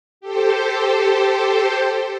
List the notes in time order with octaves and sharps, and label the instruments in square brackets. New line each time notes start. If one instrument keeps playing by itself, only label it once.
[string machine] G4 A4 C5